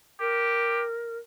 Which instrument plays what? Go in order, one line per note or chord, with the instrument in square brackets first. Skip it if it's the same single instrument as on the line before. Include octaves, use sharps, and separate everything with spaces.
[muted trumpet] G4 [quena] A#4